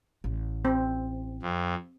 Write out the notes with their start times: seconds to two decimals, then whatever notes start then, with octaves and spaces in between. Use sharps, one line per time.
0.24 A1
0.65 C4
1.42 F2